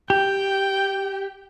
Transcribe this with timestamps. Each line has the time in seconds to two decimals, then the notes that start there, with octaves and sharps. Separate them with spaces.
0.10 G4 G5